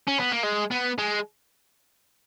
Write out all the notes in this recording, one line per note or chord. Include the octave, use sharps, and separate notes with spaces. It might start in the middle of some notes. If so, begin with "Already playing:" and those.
C#4
B3
A#3
G#3
B3
G#3